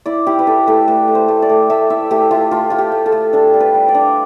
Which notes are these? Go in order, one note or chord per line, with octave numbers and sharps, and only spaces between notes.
E4 D5
E4 G4
B4
E4 A4
A3 A4
A3 B4
A3
C5
A3
D5
A3
A3 E5
E4 E5
A3 G4
A3 F4
A3 F4
A3 F4
G4
A3
A4
A3
D4 A4
G3
B4
G3
D5
D4